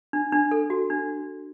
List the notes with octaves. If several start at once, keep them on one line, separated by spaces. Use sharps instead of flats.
D4
D4
A4
F#4
D4